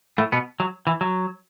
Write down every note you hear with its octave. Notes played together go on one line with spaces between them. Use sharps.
A2 A3
B2 B3
F#3
E3
F#3